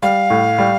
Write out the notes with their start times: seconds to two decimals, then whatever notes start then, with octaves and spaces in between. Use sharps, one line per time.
0.02 G3 F5
0.30 A2
0.59 G3